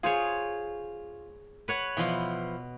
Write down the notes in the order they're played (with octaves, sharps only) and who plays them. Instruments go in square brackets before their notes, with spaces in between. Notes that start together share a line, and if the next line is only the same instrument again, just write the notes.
[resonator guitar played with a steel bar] F4 [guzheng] G#4 C5 C#5
[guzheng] B4 C#5 F#5
[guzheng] B2 [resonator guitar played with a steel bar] E3 F3